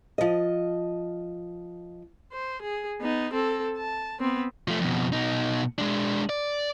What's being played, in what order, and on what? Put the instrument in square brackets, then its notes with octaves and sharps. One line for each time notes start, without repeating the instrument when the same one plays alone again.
[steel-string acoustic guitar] F3 D#5
[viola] C5
G#4
B3 D#4
C4 A4
A5
B3 C4
[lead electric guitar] F3 A3
F2 B2
B2 D#4
G#3 D4
D5